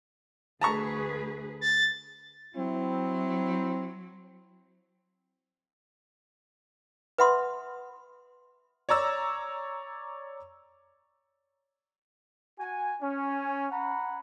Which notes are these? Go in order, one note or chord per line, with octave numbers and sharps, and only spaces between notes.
D2 G#4 B4 A5 A#5 C#6
A6
F#3 C4 E4
B4 E5 F#5 B5 C6 D#6
C#5 D5 A#5 E6
F#4 G#5
C#4
F#5 A#5 B5